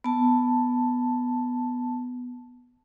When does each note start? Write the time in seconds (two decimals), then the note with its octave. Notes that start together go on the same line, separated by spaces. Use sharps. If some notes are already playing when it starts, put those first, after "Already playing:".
0.04 B3 A5